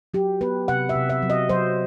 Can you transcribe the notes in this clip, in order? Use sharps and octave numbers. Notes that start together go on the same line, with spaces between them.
F#3 G4
B3 B4
C3 F#5
E5
C3
E5
F#3
D#5
F#3 C5